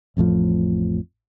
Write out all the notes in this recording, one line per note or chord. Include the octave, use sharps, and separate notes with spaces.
A1 F2 A2 F3